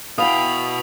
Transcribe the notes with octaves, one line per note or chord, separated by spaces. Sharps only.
E4 F#4 B4 F5 G5 B5 D#6 F7